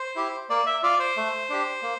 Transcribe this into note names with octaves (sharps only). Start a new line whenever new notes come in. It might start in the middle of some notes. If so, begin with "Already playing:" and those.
Already playing: C5
E4 G4
A#3 D5
E5
F4 D5
C5
A3
D4 G4
A#3